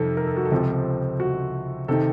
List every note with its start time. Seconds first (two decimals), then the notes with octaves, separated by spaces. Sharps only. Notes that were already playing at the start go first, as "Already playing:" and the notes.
Already playing: F2 C3 D#3 A4
0.17 A#4
0.27 A4
0.37 F#4
0.45 A4
0.51 C#2 C3 F3 C4
1.20 F#4
1.88 C3 D#3 A4